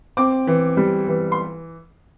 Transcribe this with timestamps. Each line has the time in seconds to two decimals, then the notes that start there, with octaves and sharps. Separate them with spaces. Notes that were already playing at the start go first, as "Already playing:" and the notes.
0.17 C4 D6
0.47 E3
0.77 G3
1.08 E3
1.32 C6